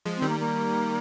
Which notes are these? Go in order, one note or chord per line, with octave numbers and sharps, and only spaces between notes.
F3 G#3
C4
D#3 G3
A#3
A#3